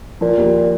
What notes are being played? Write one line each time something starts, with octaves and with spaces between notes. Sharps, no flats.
A#2 F3
D#2